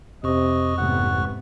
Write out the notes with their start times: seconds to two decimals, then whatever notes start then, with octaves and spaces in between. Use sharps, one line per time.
0.24 F2 C3 D#5 C#6
0.78 A1 G#2 C3 B3 F#5